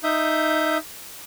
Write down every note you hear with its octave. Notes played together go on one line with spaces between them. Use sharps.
D#4 E5 D#6 G6